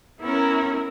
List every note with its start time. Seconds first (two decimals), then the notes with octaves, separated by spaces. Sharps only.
0.21 B3 C#4 E4 A#4